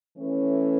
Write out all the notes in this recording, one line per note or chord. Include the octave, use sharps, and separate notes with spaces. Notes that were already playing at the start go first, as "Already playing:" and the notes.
E3 A3 C#4